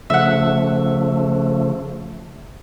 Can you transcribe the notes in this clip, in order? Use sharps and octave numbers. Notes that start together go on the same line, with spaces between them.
C#3 F3 A3 E5 F#5